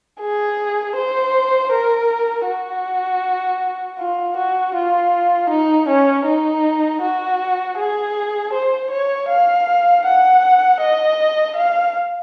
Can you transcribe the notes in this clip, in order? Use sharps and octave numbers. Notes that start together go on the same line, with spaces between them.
G#4
C5
A#4
F#4
F4
F#4
F4
D#4
C#4
D#4
F#4
G#4
C5
C#5
F5
F#5
D#5
F5